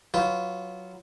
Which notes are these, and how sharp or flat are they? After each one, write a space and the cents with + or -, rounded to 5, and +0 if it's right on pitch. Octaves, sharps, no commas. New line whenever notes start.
F#3 +0 F4 -10 B4 +0